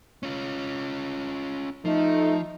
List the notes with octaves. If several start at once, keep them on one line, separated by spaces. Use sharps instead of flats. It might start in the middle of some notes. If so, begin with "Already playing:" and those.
C#4 F4
F3 A3 D#4